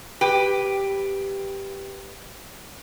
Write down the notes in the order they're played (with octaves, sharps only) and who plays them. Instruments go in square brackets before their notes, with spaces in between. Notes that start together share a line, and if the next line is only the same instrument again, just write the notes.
[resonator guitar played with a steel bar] G4 B4